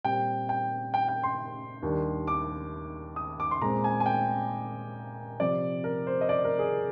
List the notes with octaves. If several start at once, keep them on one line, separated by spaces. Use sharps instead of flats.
A#2 G3 C4 G5
G5
G5
G5
C6
D#2 D#3 G3 D4
D6
D#6
D6
C6
A#2 G#3 C4 A#5
G#5
G#5
G5
C3 F3 C4 D5
A#4
C5
D#5
D5
A#4
G#4